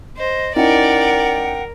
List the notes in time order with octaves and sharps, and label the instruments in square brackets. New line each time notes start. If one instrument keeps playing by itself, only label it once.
[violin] C5 [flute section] D#5
[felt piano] C#4 D#4 E4 [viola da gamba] A#4 [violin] D5 [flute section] F#5 G5